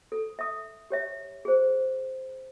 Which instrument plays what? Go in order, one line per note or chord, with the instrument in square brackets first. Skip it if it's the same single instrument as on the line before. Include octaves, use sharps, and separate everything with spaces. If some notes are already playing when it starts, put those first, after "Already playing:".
[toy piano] A4
E5 D#6
G4 C#5 E5
G#4 C5